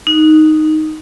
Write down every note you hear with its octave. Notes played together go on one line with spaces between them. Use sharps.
D#4